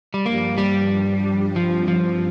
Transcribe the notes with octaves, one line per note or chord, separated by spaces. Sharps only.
G3
G2 F3 A#3 D4 G4
G3
G2 F3 G3 C4 F4
F3